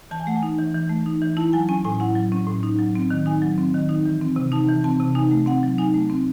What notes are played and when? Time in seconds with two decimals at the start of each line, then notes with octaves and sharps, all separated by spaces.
0.11 E3 A5
0.20 G#5
0.27 A3 F#5
0.36 G#5
0.43 D#4
0.59 E3
0.75 E3
0.89 A3
1.06 D#4
1.22 E3
1.37 E4 A5
1.53 F#3 G#5
1.69 C#4 G#5
1.85 A2 G#5
1.95 G#5
2.00 E4 F#5
2.15 F#3
2.32 C#4
2.47 A2
2.63 D#4
2.79 F#3
2.95 C4
3.10 D#3
3.26 D#4 G#5
3.42 F#3
3.58 C4
3.74 D#3
3.89 D#4
4.06 E3
4.21 C4
4.36 C3
4.52 D#4 A5
4.68 E3
4.84 C4 A5
5.00 C3
5.15 D#4 G#5
5.31 A3
5.46 C4 F#5
5.63 F#3
5.78 D#4 G#5
5.94 A3
6.10 C4